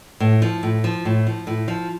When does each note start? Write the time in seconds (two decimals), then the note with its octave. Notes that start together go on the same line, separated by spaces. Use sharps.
0.20 A2
0.42 F3
0.63 A2
0.84 F3
1.05 A2
1.27 F3
1.47 A2
1.68 F3